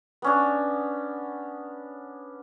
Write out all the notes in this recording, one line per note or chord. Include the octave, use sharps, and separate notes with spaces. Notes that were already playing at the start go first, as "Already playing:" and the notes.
B3 C#4 D4